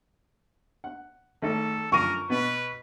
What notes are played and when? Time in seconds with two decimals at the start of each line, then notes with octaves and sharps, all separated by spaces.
0.84 F#5
1.42 G#1 A3 A4
1.92 F#2 D3 F3 A#4 C#6 D#7
2.30 B2 B3 B4